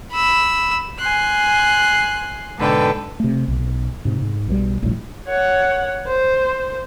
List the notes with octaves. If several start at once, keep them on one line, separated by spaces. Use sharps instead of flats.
B5 E6
G#5 C6 F#6
G#2 B2 D3 A4 B4 G5
C3 A3
B1
G#2 C3
G#2
B1 B2 D3 G3
E1 A#1 A2 G3
C#5 F#5
C5